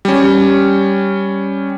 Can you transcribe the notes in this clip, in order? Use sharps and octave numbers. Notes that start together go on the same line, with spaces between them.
G3 C#4